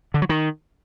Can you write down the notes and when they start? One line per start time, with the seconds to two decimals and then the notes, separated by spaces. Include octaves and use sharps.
0.14 D3
0.22 F#3
0.29 D#3